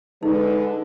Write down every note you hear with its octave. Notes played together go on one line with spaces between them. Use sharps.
D3 G#3 D#4 B4